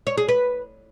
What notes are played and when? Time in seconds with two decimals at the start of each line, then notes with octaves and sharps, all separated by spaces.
0.07 C#5
0.18 G#4
0.29 B4